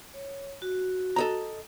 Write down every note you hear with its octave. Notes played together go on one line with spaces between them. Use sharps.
C#5
F#4
A4 D#5 A#5